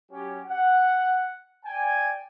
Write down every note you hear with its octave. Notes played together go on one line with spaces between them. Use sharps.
F#3 C#4 G4
F#5
D5 G5 G#5